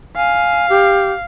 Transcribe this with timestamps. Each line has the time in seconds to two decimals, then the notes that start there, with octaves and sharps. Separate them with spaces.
0.16 F5 G#5
0.70 G4